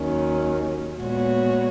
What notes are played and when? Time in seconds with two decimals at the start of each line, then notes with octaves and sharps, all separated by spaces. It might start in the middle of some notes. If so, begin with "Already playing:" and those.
Already playing: D#2 D#3 F#3 C#4
0.98 A#2 G#3 B3 F#4 C#5